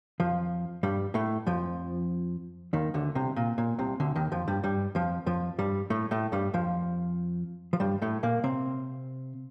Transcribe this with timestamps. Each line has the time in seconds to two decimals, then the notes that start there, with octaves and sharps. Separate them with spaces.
0.20 F2 F3
0.83 G2 G3
1.14 A2 A3
1.46 F2 F3
2.73 D#2 D#3
2.94 D2 D3
3.15 C2 C3
3.36 A#2
3.58 A#2
3.78 C2 C3
4.00 D2 D3
4.15 D#2 D#3
4.32 F2 F3
4.48 G2 G3
4.63 G2 G3
4.95 F2 F3
5.26 F2 F3
5.58 G2 G3
5.90 A2 A3
6.11 A2 A3
6.32 G2 G3
6.54 F2 F3
7.73 F3
7.80 G2 G3
8.02 A2 A3
8.23 A#2 A#3
8.44 C3 C4